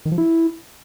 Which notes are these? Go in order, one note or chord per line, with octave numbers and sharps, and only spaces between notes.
D#3
F3
E4